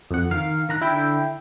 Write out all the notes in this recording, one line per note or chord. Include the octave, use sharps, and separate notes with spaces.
F2 F#5
D#3 F5 F6
D#3 A#5 F#6
D3 E4 G5